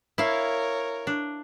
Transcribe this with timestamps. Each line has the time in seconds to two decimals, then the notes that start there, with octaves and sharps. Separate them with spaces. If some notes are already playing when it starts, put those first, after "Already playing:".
0.18 E4 A#4 C#5 F5
1.07 D4